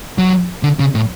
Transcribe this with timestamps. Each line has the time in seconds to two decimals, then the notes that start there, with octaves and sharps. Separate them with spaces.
0.18 F#3
0.63 D3
0.79 C#3
0.95 A2